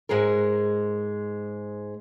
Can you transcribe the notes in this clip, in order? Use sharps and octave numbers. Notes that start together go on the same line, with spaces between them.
G#2 G#3 G#4 A#4